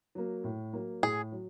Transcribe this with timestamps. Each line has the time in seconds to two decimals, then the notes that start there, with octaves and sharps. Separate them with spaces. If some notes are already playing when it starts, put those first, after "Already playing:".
0.15 F#3 A#3
0.44 A2
0.73 F#3 A#3
1.03 A2 G#4
1.32 F#3